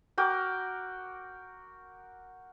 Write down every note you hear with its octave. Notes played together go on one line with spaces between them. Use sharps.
F#4 A#4 G5 D6